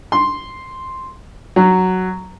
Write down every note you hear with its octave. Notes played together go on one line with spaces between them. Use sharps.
C6
F#3